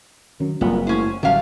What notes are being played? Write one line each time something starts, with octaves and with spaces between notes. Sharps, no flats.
F#2 D#3
F#1 F#2 A#2 F#3 G3 B3 C4
A2 C#4 C5
A1 F#2 D3 F#3 G3 A3 F5